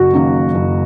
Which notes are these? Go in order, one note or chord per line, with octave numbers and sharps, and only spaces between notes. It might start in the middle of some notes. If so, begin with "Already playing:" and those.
Already playing: F#1 F#4
F#2 D#3 F#3 A#3
F#1